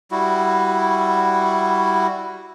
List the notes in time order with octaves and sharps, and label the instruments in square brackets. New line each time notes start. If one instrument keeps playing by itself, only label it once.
[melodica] G3 E4 F#4